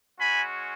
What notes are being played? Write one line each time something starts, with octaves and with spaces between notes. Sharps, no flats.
G#3 C#4 F#4 G#5 B5